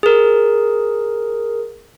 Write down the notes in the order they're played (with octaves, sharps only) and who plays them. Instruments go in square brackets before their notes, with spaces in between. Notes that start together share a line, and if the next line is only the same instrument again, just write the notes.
[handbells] G#4 A#4